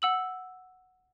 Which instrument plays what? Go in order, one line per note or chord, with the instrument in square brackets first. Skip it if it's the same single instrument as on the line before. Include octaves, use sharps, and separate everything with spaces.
[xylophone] F#5 E6 F#7